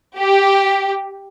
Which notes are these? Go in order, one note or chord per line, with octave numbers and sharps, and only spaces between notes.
G4